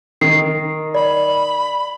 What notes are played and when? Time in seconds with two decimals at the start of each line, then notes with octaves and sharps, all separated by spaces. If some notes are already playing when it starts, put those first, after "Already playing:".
0.21 D#3 C7
0.95 D5 B5